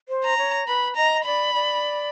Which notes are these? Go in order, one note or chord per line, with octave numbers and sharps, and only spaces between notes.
C5
A#5
C#5
B4 B5
D#5 A#5
D5 B5
D5